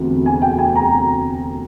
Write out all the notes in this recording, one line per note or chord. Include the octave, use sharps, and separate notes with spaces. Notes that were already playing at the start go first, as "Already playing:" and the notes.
Already playing: E1 D2 C3
G#5
G5
G#5
A#5